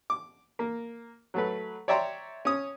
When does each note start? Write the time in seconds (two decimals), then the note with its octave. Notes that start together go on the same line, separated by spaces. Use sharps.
0.10 D6
0.59 A#3
1.34 F#3 A3 B4
1.88 C#5 D5 E5 G5 A#5 C6
2.45 C#4 D#6